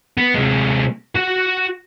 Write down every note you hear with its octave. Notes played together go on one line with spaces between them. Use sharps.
B3
C3 G#3
F#4 F#5